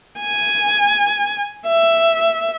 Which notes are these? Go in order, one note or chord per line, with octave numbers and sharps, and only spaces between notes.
G#5
E5